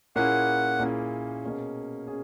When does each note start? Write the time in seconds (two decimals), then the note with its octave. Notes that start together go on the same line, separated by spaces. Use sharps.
0.16 A#2 A#3 C#4 E4 G#4 F#5
0.79 A#2 A#3 C#4 E4 G#4
1.43 B2 A#3 C#4 G#4
2.08 C#4 G#4